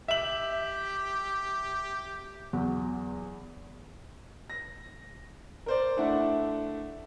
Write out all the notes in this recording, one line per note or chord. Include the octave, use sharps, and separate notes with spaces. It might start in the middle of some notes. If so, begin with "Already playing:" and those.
G4 E5 F#7
E2 F#3
A#6
A#4 C5 D5
A3 D4 E4 F#5